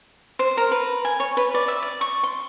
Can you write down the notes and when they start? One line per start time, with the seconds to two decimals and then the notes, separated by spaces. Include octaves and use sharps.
0.39 C5
0.57 A#4
0.71 B4
1.05 G#5
1.20 C#5
1.37 B4
1.55 D5
1.68 E5
1.82 D5
2.01 C#6
2.23 C6